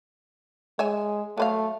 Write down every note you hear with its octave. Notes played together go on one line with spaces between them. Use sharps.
G#3 C#5 E5 G#5
F#3 A3 B4 F5